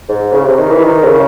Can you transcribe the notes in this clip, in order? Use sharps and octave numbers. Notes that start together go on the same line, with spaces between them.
G#2
C#3
C3
D#3
E3
D#3
C3
C#3